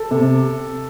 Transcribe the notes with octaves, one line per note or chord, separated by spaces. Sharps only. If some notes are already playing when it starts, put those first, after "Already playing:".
Already playing: A4
C3